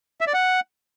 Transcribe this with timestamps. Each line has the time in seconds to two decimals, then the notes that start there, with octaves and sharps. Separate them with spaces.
0.21 E5
0.27 D5
0.34 F#5